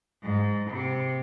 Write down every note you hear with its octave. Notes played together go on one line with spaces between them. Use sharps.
G#2
C3